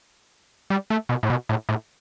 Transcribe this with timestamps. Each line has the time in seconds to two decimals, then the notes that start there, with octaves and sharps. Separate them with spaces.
0.70 G3
0.90 A3
1.09 B2
1.23 A2
1.30 B2
1.49 A2
1.69 A2